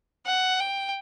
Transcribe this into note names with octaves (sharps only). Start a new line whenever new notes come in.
F#5
G5